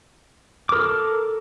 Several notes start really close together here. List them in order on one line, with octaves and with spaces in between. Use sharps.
D6 A#4 A4